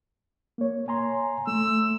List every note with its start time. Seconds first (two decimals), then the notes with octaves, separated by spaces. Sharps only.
0.58 A#3 C#5
0.88 G#5 A#5 C6
1.47 A3 E6